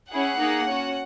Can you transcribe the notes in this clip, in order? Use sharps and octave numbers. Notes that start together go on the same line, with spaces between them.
C#4 E4 G#4 F#5
A#3 D#4 G#4
C#4 F#4